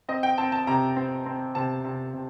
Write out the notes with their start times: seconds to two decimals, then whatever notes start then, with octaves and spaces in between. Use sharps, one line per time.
0.08 C4 D#5
0.23 G5
0.38 C4 A5
0.52 A5
0.67 C3 A#5
0.96 C4
1.26 C4
1.55 C3 A5
1.84 C3
2.14 C3